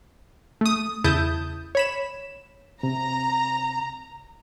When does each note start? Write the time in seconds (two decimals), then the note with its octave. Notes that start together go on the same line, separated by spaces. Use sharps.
0.61 A3 D#6
1.04 E2 C#3 E4 A5 D#6 G6
1.75 C#5 B5 E7
2.83 C3 A#5